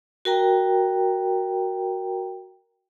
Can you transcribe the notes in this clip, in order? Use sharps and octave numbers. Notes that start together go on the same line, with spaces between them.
F#4 A#4 G5 A#5